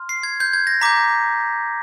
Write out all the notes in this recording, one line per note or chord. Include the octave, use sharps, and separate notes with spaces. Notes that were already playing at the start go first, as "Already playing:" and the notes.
Already playing: C6 F6
C7
G#6
G6
G#6
A#6
A#5 D6 G6 B6